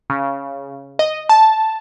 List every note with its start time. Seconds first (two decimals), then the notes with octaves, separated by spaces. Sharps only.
0.10 C#3
0.99 D#5
1.29 A5